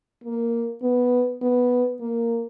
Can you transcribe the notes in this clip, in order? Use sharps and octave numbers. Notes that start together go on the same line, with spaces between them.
A#3
B3
B3
A#3